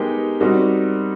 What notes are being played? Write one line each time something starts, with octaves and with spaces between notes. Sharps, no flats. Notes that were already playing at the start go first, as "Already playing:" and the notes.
Already playing: G#3 B3 D#4 G4 A#4
G3 C4 D#4 F#4 A#4